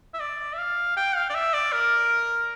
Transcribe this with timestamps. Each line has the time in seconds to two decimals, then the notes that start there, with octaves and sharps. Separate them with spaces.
0.14 E5
0.20 D5
0.53 E5
0.58 F5
0.97 G5
1.15 F5
1.30 D5
1.34 E5
1.53 D5
1.72 A#4